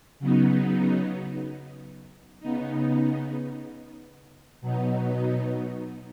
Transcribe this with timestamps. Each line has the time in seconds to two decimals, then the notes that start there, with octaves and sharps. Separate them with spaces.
0.19 C#3 F#3 B3 D#4
2.40 C#3 B3 D#4
4.61 B2 F#3 B3 D#4